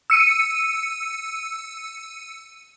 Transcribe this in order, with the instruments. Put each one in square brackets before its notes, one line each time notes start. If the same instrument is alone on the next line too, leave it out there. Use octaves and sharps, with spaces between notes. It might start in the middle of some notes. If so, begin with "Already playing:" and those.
[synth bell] E6 C#7 D#7